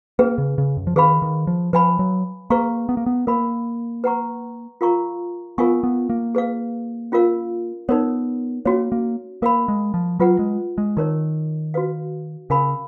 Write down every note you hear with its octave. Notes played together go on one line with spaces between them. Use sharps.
A#3 C#4 G#4 B4
C#3
C#3
F#2
F3
D#3 G#4 B4 F5 B5
D#3
F3
F3 B4 F5 G#5 B5
F#3
A#3 G#4 B4 F5 A#5 C#6
B3
A#3
B3
A#3 A#4 F5 B5
B4 F#5 A#5 C#6
F4 A#4 F5 A#5 C#6
B3 F4 A#4 F5 G#5 C#6
B3
A#3
G#4 B4 F5
C#4 F4 A#4 F5
B3 D#4 A#4 C#5
A#3 C#4 F#4 C#5
A#3
A#3 A#4 F5 B5
G#3
F3
F#3 F4 B4 F#5
G#3
G#3
D#3 D#4 A#4 C#5
F#4 B4 F5
C#3 A#4 F5 G#5 B5